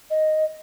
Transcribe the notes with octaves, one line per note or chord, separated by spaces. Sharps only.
D#5